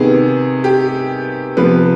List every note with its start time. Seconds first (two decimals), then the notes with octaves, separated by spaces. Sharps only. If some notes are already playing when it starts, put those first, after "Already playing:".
Already playing: C3 D#3 B3 G#4
0.64 G4
1.57 C3 F3 B3 B4